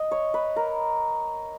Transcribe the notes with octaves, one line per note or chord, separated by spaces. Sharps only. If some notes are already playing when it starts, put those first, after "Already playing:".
Already playing: D#5
C#5
B4
A#4